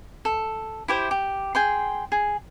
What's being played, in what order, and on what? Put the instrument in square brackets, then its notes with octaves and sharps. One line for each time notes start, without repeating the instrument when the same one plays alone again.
[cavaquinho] A4
E4 G4 C5
G4
G#4 G5 C6
G#4